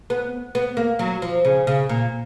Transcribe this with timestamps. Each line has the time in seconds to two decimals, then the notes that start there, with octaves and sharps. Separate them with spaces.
0.10 B3
0.55 B3
0.77 A#3
0.99 F#3
1.22 F3
1.45 C#3
1.67 C#3
1.89 A#2